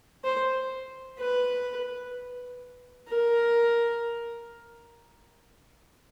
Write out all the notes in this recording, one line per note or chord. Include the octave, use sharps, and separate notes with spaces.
C5
B4
A#4